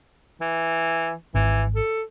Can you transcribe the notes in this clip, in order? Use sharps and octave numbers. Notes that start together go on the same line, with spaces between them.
E3
G#1 E3
A4